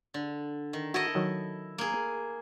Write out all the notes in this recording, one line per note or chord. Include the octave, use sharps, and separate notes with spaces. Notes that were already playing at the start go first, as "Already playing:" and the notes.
D3
D#3
E4 F#4 A4 D#5
D#3 F#3
A#3 G#4